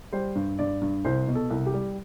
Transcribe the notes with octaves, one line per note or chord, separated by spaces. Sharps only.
G3 C5
G2
G2 D5
G2
C2 C5
B2
A4
C2
G4
G3